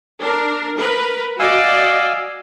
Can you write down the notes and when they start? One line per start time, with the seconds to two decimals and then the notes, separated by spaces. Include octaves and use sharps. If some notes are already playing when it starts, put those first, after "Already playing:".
0.20 D4 A#4
0.78 A#4 B4
1.40 F#4 D5 D#5 F5 G#5 E6